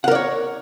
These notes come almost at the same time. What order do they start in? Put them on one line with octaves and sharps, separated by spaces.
F#5 A#4 D5 C#5